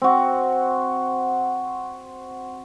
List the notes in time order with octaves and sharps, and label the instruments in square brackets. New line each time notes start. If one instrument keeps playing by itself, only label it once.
[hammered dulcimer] C4 F#4